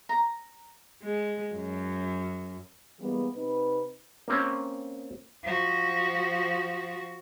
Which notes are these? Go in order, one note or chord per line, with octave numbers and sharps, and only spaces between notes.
A#5
G#3
F#2
E3 G3 G#3 A#3 B3
C3 C4 D#4 B4
A#3 C4 C#4
F3 F#4